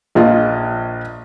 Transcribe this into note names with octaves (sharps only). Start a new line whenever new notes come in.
A#1 F4 D#5